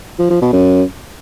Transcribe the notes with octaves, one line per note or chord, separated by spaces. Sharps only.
F3
F3
B2
F#2